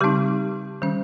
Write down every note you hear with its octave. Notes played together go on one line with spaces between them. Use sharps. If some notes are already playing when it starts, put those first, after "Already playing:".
C#3 G3 C4 D#4 G4
D#3 G3 C#4